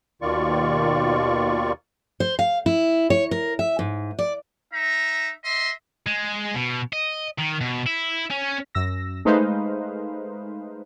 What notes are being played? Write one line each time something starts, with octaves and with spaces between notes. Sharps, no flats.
D#2 B2 D#3 F4 D5 C#6
C5
F5
E4
C#5
A#4
E5
G#2
D5
D#4 E5 A#5
D#5 E5 C6
G#3
B2
D#5
D#3
B2
E4
C#4
F#2 E6 A#6
G#3 A3 D#4 B4 C5 F5